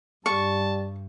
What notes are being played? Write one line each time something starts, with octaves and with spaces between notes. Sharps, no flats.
G2 G3 A5 C#6